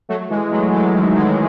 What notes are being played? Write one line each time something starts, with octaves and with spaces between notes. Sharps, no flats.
F#3 A3
E3 G#3
F#3 A3
E3 G#3
D#3 F#3
E3 G#3